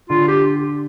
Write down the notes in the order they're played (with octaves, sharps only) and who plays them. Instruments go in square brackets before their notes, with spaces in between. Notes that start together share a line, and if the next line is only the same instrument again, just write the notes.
[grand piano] D3 [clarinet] F4
[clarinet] G4